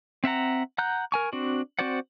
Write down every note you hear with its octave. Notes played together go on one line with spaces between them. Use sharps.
C4 E5 F#5 A#5
F#5 A#5 F#6 G6
A#4 G#5 C#6
C4 D4 F#4
C4 F#4 C5 D5 F#5